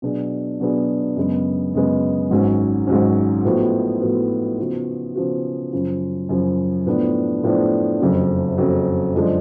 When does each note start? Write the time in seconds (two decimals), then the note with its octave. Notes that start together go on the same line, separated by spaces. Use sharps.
0.02 B2 F#3 B3 D4 G#4
0.60 B2 F#3 B3 D4 G#4
1.17 F#2 C#3 G#3 B3
1.74 F#2 C#3 G#3 B3
2.31 G#1 G#2 F#3 C#4
2.87 G#1 G#2 F#3 C#4
3.45 A2 F3 B3 F#4
4.02 A2 F3 B3 F#4
4.59 C#3 F3 B3 F#4
5.15 C#3 F3 B3 F#4
5.73 F#2 C#3 F3
6.29 F#2 C#3 F3
6.86 A2 F3 B3 D4
7.44 A2 F3 B3 D4
8.00 F#1 F2 C#3 F#3
8.58 F#1 F2 C#3 F#3
9.15 F#2 D3 F3 G#3 D4